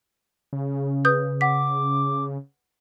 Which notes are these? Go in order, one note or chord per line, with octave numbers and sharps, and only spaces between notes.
C#3
B4 D#6 G6
F#5 D6 B6